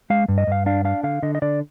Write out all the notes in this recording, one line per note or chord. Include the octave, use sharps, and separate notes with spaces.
G#3 F5
G2
D#5
G2 F5
D4 F5
D4 F5
D3 F5
D3 D#5
D#5
D3 D5